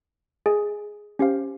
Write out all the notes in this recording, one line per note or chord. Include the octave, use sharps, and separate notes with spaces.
G#4 D#5 G#5
C#4 G4 C5 F5